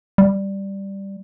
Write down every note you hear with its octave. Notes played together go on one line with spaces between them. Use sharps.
G3